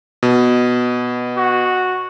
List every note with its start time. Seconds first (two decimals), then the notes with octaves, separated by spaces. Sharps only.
0.23 B2
1.37 F#4